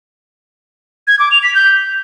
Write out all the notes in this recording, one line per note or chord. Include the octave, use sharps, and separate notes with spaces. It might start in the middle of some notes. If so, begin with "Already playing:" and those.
G#6
D6
F7
B6
G6